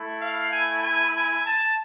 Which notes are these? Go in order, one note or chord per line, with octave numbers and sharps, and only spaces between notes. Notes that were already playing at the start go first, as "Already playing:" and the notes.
Already playing: A3 E4
F5
G#5
G#5
G#5
A5